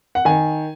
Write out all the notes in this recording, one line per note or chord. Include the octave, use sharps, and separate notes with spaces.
F#5
D#3 G#5